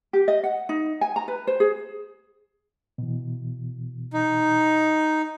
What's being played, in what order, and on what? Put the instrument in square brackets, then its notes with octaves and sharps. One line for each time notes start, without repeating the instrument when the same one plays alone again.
[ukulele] G4
D#5
F#5
D#4
G#5
A#5
B4
C5
G#4
[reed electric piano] B2 E3
[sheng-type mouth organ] D#4